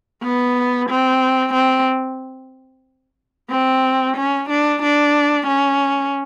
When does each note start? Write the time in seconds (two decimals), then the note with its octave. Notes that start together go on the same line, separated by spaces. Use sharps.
0.23 B3
0.89 C4
1.54 C4
3.50 C4
4.17 C#4
4.50 D4
4.82 D4
5.47 C#4